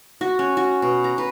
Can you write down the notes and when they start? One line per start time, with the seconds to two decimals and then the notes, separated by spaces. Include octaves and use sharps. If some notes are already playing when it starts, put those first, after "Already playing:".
0.21 F#4
0.39 C#4
0.57 F#4
0.82 B2
1.04 A#5
1.18 B4